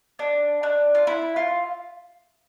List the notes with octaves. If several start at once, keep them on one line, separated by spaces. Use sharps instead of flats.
D4
D4
F4
E4
F4